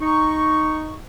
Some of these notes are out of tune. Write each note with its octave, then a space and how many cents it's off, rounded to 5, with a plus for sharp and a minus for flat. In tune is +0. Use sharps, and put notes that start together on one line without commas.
D#4 -5 C#6 +0